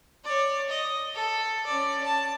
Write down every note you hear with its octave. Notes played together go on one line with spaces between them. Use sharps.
C#5 D5
D#5
A4
C#4 D5
A5